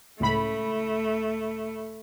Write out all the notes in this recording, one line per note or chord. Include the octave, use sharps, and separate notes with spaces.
C#2 A2 A3 B5